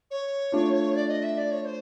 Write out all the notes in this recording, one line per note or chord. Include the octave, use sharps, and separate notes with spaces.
C#5
A3 D4 F4
D5
D#5
E5
D5
C#5
C5